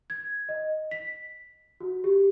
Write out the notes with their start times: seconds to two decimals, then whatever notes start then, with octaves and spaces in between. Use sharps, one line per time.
0.10 G#6
0.49 D#5
0.91 B6
1.81 F#4
2.04 G4